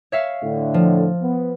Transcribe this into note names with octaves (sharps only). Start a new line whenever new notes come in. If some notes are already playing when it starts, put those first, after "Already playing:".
C#5 E5 F5
A2 D3
F3
B3